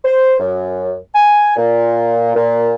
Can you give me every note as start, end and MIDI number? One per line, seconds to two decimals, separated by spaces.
0.05 0.34 72
0.39 0.92 42
1.15 1.54 80
1.56 2.33 46
2.34 2.74 46